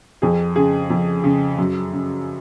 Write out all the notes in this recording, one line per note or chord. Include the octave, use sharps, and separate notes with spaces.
F2 G#4
C#3 G#4
F2
C#3
F#2
C#3